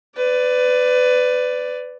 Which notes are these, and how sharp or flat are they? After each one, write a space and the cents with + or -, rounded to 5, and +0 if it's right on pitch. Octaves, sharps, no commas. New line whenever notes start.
B4 +20 D5 +0